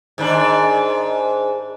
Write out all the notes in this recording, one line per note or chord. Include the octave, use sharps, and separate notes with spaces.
G#2 D#3 D4